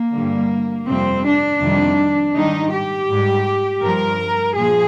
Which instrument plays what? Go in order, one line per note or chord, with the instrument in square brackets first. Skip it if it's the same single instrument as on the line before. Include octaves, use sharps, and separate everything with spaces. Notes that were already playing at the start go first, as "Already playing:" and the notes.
Already playing: [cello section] A#3
G2 D3 G3
F2 C3 G3 C4
D4
F2 C3 D#3 G3
G#2 D#3 G3 D#4
G4
G#2 G3
G2 F3 A#4
A#2 F3 G#4